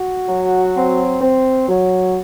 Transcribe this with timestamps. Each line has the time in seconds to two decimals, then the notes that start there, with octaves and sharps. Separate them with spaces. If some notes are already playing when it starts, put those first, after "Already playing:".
Already playing: F#4
0.29 F#3
0.75 C4
1.22 C4
1.68 F#3